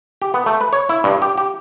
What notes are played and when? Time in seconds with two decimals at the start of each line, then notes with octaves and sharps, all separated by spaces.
0.22 G4
0.34 B3
0.46 A3
0.61 B4
0.73 C#5
0.89 E4
1.04 G2
1.22 G4
1.38 G4